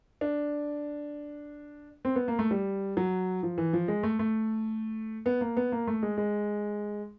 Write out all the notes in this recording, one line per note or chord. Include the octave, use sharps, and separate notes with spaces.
D4
C4
B3
A#3
A3
G3
F#3
F3
E3
F3
G#3
A3
A3
B3
A#3
B3
A#3
A3
G#3
G#3